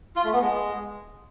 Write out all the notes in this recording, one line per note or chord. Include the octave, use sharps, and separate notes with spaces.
F4
A3
B3
G#3